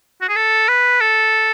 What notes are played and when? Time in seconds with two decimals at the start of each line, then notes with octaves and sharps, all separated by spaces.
0.21 F#4
0.29 G#4
0.36 A4
0.68 B4
1.01 A4